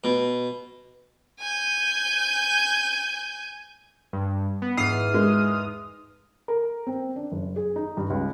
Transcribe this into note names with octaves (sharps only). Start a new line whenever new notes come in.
B2
G#5 G6
G2
B3
E2 G#2 D#6 F6 C7
G#3
A#4
C4
D4
F#1
G#4
D#4
G2
C#2